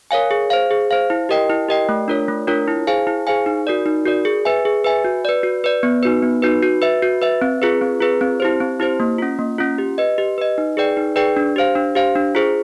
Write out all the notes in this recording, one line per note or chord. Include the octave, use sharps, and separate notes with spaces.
A#4 C#5 F5 G#5
G#4
C5 F5
G#4
C5 F5
E4
G4 A#4 D#5 G5
E4
G4 A#4 D#5 G5
A3
D4 F4 A#4 C#5
A3
D4 F4 A#4 C#5
E4
G#4 C5 F5 G#5
E4
G#4 C5 F5 G#5
D#4
F#4 A#4 D5
D#4
F#4 A#4 D5
G#4
B4 E5 G#5
G#4
B4 E5 G#5
F#4
B4 D5
F#4
B4 D5
B3
D#4 F#4 B4
B3
D#4 F#4 B4
F#4
B4 E5
F#4
B4 E5
C4
F4 G#4 B4
C4
F4 G#4 B4
C4
E4 G4 C5
C4
E4 G4 C5
A#3
C#4 F4
A#3
C#4 F4
G4
B4 D#5
G4
B4 D#5
D#4
G#4 B4 D5 G5
D#4
G#4 B4 D5 G5
D4
G4 C5 F5
D4
G4 C5 F5
D4
F4 G#4 C5